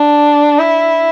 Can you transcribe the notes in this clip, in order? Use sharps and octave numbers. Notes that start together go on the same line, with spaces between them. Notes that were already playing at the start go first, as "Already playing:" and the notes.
Already playing: D4
E4